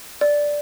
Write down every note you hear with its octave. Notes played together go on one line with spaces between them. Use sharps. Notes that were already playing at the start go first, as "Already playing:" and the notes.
D5